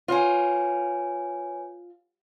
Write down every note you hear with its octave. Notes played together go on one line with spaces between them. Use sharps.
F4 B4 C#5 G#5